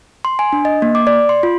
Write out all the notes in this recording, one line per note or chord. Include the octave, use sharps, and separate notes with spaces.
C6
G#5
D4
D#5
A#3
D6
D5
C6
F4